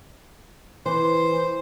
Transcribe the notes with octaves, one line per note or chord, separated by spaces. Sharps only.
E3 C5